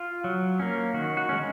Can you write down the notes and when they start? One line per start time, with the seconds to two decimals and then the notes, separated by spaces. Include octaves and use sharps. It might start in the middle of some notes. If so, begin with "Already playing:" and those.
Already playing: F4
0.24 F#3
0.60 A#3 C#4
0.94 D#3 F#4
1.17 F#4
1.29 G#3 C#4